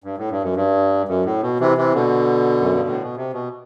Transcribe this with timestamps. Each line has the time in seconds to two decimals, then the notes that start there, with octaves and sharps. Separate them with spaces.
0.04 G2
0.18 A2
0.31 G2
0.43 F#2
0.56 G2
1.08 F#2
1.26 A2
1.42 B2
1.60 C3 E3
1.77 C3 E3
1.94 B2 D3
2.60 F#2
2.74 G2
2.88 A2
3.02 B2
3.16 C3
3.33 B2